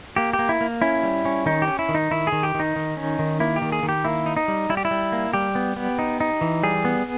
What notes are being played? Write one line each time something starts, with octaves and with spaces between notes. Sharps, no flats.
A#3 G4
G4
A#3
E4
A#3
C#4 E4
G3
C#4
D#3 D#4
G4
C#4
E4
D#3
D#4
D#3 E4
G#4
D#3
G4
D#3
D#4
D#3
C#4
D#3
A#3 E4
G4
D#3
G#4
D#3
G4
A#3 E4
D#4
D#4
G3
G3 E4
G4
E4
G3
A#3
G3 G4
B3
B3
D#4
D#4
E3
G3 G#4
B3